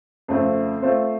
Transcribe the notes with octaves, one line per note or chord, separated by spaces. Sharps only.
F2 C#3 A3 C4
A3 C4 F4 C5